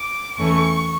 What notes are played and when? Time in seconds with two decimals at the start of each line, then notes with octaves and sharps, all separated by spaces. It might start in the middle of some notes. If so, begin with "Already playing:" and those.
Already playing: D6
0.38 E2 E3 A3 C#4 C#6